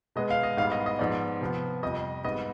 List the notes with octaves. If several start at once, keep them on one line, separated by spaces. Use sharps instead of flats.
B2 G#3 B3 D#5
F5
D#5
G#2 G3 B3 F5
D#5
D#5
G#2 F3 B3 D5
C3 F3 B3
F2 C3 G3 D#5
G#2 G3 B3 D#5